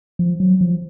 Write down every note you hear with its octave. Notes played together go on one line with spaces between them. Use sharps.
F3
F#3
F3